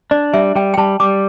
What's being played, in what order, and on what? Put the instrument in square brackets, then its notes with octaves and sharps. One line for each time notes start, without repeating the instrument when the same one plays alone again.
[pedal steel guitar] D4 [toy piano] D5
[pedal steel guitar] G3 [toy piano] E5
[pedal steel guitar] G3 [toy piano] G5
[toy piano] G5
[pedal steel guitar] G3 [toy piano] A5
[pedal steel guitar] G3 [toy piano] D6